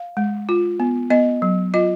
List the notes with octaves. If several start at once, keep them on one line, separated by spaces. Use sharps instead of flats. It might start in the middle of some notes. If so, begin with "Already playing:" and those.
Already playing: F5
G#3
F4
B3
B3 D#5
F#3
F4 D#5